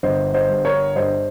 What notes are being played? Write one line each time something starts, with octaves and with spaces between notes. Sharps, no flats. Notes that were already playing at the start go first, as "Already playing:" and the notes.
G1 C5 D#5
C5 D#5
G2
A#4 C#5
G2 C5 D#5